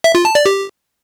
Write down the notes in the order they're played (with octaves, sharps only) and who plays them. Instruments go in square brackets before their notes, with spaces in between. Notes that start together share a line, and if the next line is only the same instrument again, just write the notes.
[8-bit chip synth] E5
F4
A5
D5
G4